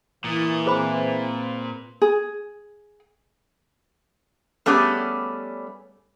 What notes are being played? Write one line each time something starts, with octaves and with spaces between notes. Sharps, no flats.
A#2 E3 D#6
C4 G#4 B4 C5 B5
G#4
G3 A3 B3 C#4 G4 G#4